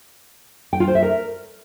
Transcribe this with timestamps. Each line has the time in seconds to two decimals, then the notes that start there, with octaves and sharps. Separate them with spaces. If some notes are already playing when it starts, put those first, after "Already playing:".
0.73 G5
0.80 F4
0.88 C5
0.95 E5
1.02 A#4